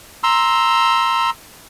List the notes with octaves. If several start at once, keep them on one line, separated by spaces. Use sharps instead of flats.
A#5 C6 E6